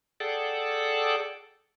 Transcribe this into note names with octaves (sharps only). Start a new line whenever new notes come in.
G#4 A4 D5 F#5 G5 A5